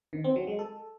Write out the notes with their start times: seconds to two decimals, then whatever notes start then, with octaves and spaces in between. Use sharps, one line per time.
0.13 D#3
0.24 C4
0.36 F#3
0.47 G#3
0.59 A4